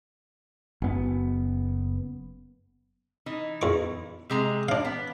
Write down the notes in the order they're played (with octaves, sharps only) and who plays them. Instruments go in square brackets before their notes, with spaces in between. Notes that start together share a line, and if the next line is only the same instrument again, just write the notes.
[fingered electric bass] F#1 B3
[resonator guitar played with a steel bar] E3 D#4
[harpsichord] E2 C#6
[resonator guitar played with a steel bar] C3 G#3 A#5
[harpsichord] D4 F5
[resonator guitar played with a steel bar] B3